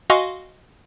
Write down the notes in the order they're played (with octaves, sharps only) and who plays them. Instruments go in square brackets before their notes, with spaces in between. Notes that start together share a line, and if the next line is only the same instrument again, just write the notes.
[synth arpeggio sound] F#4 D#5 F5 G#5 C6 C#6